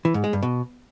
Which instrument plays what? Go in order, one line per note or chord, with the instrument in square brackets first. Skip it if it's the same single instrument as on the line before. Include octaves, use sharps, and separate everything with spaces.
[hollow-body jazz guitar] E3
G#2
G#3
G2
B2